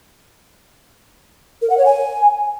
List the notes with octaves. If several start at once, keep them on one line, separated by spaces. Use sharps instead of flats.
A#4
F#5
C#5
G#5